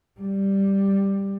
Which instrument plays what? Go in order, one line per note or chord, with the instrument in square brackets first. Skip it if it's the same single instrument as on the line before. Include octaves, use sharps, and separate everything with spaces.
[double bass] G3